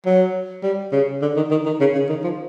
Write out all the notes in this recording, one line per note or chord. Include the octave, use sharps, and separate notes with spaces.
F#3
G3
C#3
D3
D#3
D#3
D#3
C#3
C#3
D#3
F3